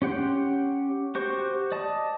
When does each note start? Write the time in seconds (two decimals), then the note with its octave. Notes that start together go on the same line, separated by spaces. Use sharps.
0.02 C#4 G4 F#5 G5 C6
1.15 F#4 G4 C5 C#6
1.72 D5 D#5 A5